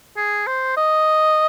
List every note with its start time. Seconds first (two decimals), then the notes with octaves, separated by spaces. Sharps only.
0.16 G#4
0.47 C5
0.77 D#5